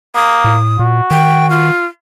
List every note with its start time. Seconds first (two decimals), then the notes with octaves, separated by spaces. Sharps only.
0.15 A#3 D#6
0.44 A2
0.79 A#2 F#4
1.11 D#3 G5
1.50 F4